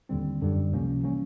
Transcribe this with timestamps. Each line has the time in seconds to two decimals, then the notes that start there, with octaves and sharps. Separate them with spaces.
0.09 D#2 D3 G3 C4
0.41 F#2 D3 G3
0.73 C#2 C3 F3 A#3 C#4
1.03 E3 G3 A#3 C#4